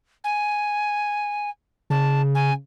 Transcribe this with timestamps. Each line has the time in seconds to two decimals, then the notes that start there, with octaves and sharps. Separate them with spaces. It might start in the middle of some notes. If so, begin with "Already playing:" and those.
0.24 G#5
1.90 C#3 A5
2.35 G#5